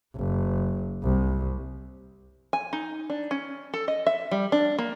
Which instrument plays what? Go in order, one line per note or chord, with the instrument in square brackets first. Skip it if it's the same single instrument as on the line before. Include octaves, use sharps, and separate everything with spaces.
[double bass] F#1
C2
[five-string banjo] G#5
D#4
D4
C#4
A4
D#5
E5
G3
D4
A#3